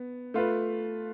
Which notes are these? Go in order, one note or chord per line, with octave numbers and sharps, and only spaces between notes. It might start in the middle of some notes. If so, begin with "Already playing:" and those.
Already playing: B3
A3 F4 B4